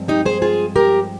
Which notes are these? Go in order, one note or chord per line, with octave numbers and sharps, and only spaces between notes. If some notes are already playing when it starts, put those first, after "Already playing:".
Already playing: G2 F3 G#3 C4
D#4 G4
G#4 C5
F4 G#4
G4 A#4